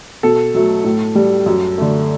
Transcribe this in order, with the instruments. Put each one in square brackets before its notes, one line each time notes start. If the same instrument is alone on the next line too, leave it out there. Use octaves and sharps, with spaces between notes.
[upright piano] B2 A4
F#3 A3
A2
G3
F#2
D3 A3